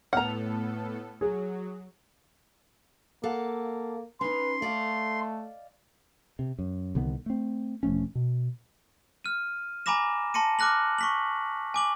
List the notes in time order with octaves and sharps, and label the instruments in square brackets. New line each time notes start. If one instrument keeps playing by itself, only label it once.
[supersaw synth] A2 B3 A4 [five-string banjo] F#5 A#5 [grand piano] F6
[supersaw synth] F#3 [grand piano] G#4
[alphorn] A#3 [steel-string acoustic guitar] A4 F5 F#5
[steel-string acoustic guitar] C#4 D#4 [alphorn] B4 [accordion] C6
[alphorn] A3 [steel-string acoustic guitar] D5 D#5 F5
[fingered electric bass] C3
F#2
C2 D3 D#3 B3
A3 C4
E1 F3 A3 C#4
B2
[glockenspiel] F6 D#7
G#5 A#5 B5 D6 A#6 E7
A5 C6 A#6 C#7 D#7
D6 F6 F#6 A#6 F#7
C#6 B6 F#7
G#5 D6 F#7